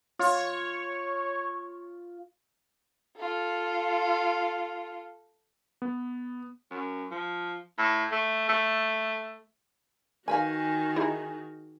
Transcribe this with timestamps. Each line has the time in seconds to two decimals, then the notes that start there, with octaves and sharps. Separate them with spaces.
0.19 F4 C#5
3.18 F4 A4
5.82 B3
6.70 F#2
7.11 F3
7.78 A2
8.12 A3
8.49 A3
10.28 D#3 F#4 A#4 B4 F5 G#5
10.96 D#4 E4 G#4